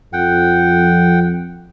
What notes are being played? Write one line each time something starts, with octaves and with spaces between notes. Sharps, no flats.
F2 F#5 G5